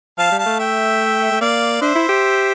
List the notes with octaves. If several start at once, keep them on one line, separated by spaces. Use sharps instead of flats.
F3 F5 A5
G3
F5 A5
A3
E5 G5
A3
A#3 D5 F5
D4 C5 E5
E4
G4